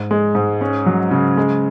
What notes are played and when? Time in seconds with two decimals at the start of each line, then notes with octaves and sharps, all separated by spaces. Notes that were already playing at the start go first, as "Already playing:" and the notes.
Already playing: G#2
0.11 G#3
0.35 G#2
0.61 C#4
0.86 F#3
1.11 C#3
1.37 G#3